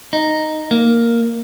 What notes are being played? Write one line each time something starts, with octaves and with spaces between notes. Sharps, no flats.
D#4
A#3